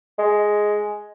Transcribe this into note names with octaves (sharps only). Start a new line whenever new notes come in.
G#3